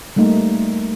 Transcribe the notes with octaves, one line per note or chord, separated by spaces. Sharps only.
G3 A3 A#3 D#4